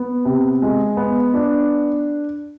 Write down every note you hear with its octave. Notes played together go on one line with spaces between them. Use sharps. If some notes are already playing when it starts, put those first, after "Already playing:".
Already playing: B3
C3
G#3
B3
D4